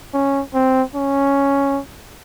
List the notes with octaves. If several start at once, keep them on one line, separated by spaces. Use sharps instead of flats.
C#4
C4
C#4